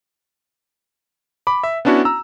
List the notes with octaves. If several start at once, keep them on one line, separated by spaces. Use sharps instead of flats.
B5 D6
E5
B3 C#4 D4 E4 F#4
A#5 E6